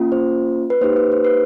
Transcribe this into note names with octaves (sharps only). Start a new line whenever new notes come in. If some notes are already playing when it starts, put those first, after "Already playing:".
Already playing: A#3 C#4 F4
C5
B4
A#3 D#4 G4 C5
B4
C5
B4